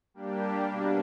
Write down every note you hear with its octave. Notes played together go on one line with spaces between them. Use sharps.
G3 A#3 D4 G4
B2 G3 A#3 D4